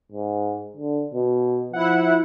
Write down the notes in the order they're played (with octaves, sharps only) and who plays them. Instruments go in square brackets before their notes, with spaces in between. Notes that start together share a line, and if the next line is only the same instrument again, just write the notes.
[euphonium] G#2
D3
B2
[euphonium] F3 [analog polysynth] E4 F#5